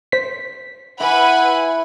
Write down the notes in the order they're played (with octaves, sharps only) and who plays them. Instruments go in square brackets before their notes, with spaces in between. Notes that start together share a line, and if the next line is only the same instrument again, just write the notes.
[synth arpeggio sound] C5 B6
[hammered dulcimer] E3 E4 [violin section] B4 G#5 B5 [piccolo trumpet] F#5